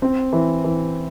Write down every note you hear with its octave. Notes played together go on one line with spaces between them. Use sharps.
C4
E3
E3